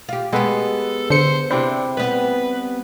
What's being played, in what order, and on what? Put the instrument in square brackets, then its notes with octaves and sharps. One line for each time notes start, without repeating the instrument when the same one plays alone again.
[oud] F4 G4
[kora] G#3 B4 [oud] B3 G4 [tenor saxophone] A4
[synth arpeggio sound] D3 C#7 [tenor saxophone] C5
[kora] C3 C4 E4 [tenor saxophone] D4 [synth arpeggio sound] C5
[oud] G3 B3 [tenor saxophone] B4